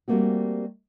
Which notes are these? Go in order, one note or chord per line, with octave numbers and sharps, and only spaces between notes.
G3 A3 A#3 C4 F#4